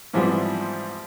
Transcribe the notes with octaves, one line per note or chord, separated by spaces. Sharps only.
G#2 E3 F3 G3 B3 C4